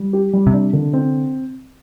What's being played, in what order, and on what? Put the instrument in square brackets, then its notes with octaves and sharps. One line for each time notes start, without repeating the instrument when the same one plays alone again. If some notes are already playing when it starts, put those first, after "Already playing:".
Already playing: [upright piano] G3
G4
G3
[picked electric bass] C3
[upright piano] D4
D3
C4